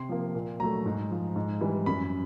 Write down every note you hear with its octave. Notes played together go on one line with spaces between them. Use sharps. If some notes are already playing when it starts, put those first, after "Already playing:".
Already playing: C3 C6
F3 A#3
A#2
F#3 A3 A#5
G#2
F3 G#3
G#2
E3 G3
F#2 B5